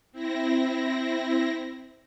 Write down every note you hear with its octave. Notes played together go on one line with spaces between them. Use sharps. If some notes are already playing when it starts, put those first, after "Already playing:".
C4 E4 A#6